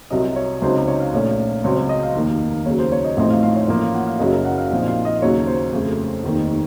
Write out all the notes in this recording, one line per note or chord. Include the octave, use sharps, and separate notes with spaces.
C2 C3 F#3 D#5
C#5
C#2 C#3 F#3 C4 D#4 C5
C5
C#5
F5
A#1 A#2 A3 C#4
C#2 C#3 F#3 C4 C#5
C#5
D#5
F5
F1 D#2 D#3 A#3
D#2 C#3 F#3 C#5
C5
C#5
D#5
A1 A2 F3 C4 D#4 D#5
F5
F5
C#5
A1 A2 F3 A#3 C#4 C#5
F5
F#5
F5
F#1 F#2 C#3 F#3 D#5
A#4
F#5
F5
A#1 A#2 F3 C4 D#4 F5
F5
D#5
D#2 C#3 F#3 C#5
C5
F2 C#3 A3
F1 D#2 D#3